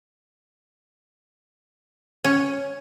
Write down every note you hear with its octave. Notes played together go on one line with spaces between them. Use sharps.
C#4